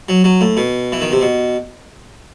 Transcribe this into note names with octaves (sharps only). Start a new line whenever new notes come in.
F#3
F#3
A2
B2
E3
D#3
C3
B2